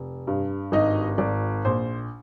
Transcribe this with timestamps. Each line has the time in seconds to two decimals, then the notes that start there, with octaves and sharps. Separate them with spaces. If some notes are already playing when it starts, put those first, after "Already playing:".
Already playing: F1
0.27 G2
0.72 G#1 D#4 D#5
1.18 G#1 D5
1.65 A#1 C5